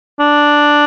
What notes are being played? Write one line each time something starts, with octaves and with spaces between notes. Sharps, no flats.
D4